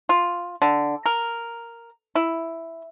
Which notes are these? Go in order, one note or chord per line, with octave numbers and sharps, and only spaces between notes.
F4
D3
A#4
E4